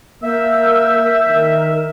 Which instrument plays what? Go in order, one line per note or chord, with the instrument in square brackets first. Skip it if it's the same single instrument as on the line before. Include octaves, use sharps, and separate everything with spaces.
[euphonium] A#3 [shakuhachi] A#4 [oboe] E5 [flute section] E6 G6
[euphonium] D#3 [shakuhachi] A#4